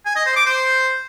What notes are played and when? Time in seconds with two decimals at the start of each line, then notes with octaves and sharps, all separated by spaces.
0.05 G#5
0.16 D#5
0.26 C5
0.36 D6
0.46 C5